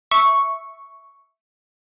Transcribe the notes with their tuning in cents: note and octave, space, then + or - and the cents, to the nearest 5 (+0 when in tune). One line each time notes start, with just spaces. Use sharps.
E5 -5 C#6 +0